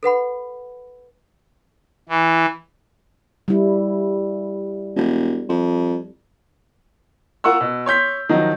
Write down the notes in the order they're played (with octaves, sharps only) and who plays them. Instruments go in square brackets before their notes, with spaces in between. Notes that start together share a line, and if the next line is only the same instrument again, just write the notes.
[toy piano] A4 B4 F#5 B5
[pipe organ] E3
[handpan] G3 E4
[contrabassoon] E1
F2
[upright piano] F4 A#4 F#5 C#6 E6
B2
C#5 C6 G6 B6
D#3 F3 F#3 D#4